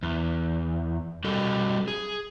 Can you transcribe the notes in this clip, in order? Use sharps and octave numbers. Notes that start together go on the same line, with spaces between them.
E2
G3 F#4 A4
G#4